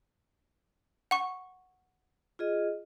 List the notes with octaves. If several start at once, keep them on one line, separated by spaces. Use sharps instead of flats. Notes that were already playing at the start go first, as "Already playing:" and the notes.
F#5 C#6
F4 G#4 D#5